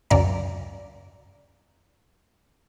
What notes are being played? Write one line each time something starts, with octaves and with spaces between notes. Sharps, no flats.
C#2 F#2 D5 A#5